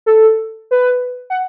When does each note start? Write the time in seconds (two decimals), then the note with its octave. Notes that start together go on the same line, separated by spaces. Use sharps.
0.06 A4
0.71 B4
1.30 F#5